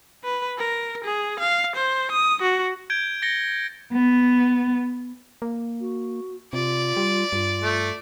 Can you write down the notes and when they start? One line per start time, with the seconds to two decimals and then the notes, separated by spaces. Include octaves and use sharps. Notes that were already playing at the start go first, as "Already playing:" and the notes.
0.24 B4
0.59 A#4
1.04 G#4
1.40 F5
1.76 C5
2.12 D#6
2.42 F#4
2.90 G6 G#6 D7 G7
3.22 A6 A#6 C#7 G7
3.92 B3
5.42 A#3
5.81 F#4
6.53 C3 F4 D5
6.97 G3
7.33 G2 F4
7.62 A3